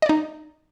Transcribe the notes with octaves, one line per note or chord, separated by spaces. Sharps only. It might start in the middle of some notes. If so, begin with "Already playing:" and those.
D#4 D5 D#5